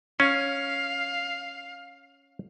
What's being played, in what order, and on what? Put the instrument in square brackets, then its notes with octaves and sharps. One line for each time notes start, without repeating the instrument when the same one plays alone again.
[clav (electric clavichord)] C#4 [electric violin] F5